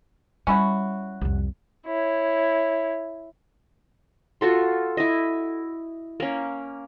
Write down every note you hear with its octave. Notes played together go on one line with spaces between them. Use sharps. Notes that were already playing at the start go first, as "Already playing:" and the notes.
G3 C#4 E4 F#4
C2 F2
E4 C#5
F4 F#4 A4 C6
E4 D#5
A#3 C#4